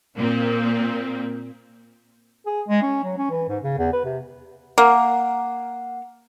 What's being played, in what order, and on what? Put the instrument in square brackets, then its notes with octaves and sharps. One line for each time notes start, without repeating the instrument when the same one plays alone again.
[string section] A#2 A#3 C4
[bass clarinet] G#4
G#3
C#4
F#3
C#4
E3
G#2
C#3
E2
B4
C3
[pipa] A#3 [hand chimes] F#5